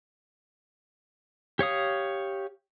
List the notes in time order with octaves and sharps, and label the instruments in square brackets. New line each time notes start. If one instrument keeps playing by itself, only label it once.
[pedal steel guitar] G4 C#5 F5 D#6